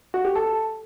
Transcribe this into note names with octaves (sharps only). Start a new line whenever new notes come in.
F#4
G4
A4